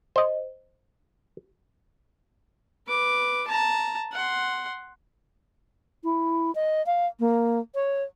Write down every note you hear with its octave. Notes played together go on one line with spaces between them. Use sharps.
C5 D#5
B4 D6
A5 A#5
F#5 C6
E4
D#5
F5
A#3
C#5